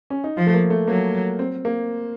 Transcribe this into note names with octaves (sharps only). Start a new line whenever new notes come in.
C#4
D#4
F3 F4
A3
A#3
A3
F#3 A#3
C4
A#3